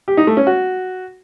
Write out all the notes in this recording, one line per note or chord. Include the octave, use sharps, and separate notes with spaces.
G4
D#4
A3
C#4
F#4